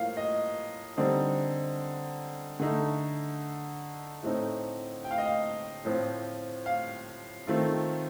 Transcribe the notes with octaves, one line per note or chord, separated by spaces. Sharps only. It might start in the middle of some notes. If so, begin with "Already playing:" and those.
Already playing: A2 F3 A#3 F5
D#5
D3 G3 C4 D#4
D3 A3 D#4
A2 A3 C4 D#4
G5
F5
D#5
F5
A2 F3 C4 F4
F5
D#3 A3 C4 F4